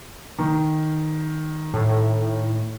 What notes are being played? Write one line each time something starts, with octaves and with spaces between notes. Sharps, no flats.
D#3
A2